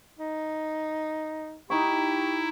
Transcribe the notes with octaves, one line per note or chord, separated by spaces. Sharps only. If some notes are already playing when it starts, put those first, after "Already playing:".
D#4
D#4 E4 G4 C#6